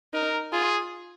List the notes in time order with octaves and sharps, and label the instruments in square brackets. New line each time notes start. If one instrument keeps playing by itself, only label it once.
[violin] D#4 [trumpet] A#4
[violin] F4 [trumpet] G#4